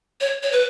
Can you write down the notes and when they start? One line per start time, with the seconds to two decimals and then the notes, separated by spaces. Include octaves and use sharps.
0.21 C#5
0.43 C#5
0.52 B4